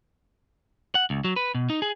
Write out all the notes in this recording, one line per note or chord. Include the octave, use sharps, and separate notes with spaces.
F#5
C#2
F#3
B4
B2
D#4
G#4